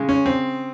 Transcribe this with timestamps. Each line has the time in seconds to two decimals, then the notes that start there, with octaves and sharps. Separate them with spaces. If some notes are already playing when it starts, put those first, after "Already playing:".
Already playing: C#3 G#3
0.09 C#4
0.26 C4